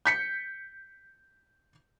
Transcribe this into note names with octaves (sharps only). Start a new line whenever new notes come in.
G6 B6 C#7